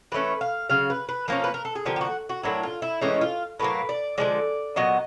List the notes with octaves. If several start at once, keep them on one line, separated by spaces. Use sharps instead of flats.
E3 A3 C#4 B4
F5
C#3 F#3 F5
B4
B4
F3 A#3 C#4 A#4
B4
A#4
A4
G#4
D3 F3 A#3 G4
G4
F#4
F#4
A2 F#3 A#3 D4 E4
F4
E4
A2 E3 G#3 C#4 D#4
F4
A2 F#3 A#3 B4
D5
D3 F3 G#3 D5
A#2 F#3 B3 D#5